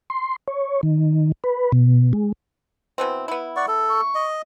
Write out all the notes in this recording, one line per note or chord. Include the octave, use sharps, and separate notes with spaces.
C6
C#5
D#3
B4
B2
G#3
B2 E3 C4
B3 E4
D5 F#5 C#6
A4
C#6
D#5